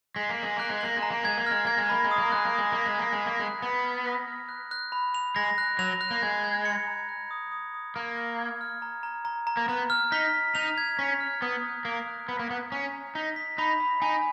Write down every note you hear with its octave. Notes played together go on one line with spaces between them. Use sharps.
G#3 B6
A#3
F#7
G#3
A#3 F#6
G#3
A#3 F#7
G#3
A#5
A#3
G#3 G#6
A#3
G#3 F6
A#3 G#6
G#3
A#3 B5
G#3
D#6
A#3
G#3 F#6
A#3
G#3 D#6
A#3 B6
G#3
A#3 F#6
G#3
B6
A#3
G#3 F#6
B3 F7
F6
A#6
F6
F#6
F#6
B5
F7
G#3 A#6
F#6
F#3 F7
F#6
A#3
G#3 G#6
G#6
C#7
A#5
F#6
D#6
D#6
D#6
A#3 F6
F6
G#6
F6
A#5
A#5
A#5
A#5
A#3
B3 A#5
F6
D#4 B6
B6
D#4 F7
G#6
C#4 B6
F6
B3 D#6
F#6
A#3 D#6
F#6
B3 B6
A#3
B3 A#5
C#4 A#5
A#5
D#4 B6
B6
D#4 B5
B5
D#4 G#5